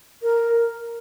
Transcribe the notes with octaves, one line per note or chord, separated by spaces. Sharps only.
A#4